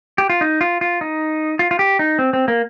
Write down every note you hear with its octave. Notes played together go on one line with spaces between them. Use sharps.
G4
F4
D#4
F4
F4
D#4
F4
F4
G4
D#4
C4
C4
A#3